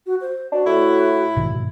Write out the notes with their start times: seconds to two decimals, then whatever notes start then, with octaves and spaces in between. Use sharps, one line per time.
0.06 F#4
0.21 C5
0.52 D4 F#4
0.66 A2 E4
1.36 G#2 B2 D#3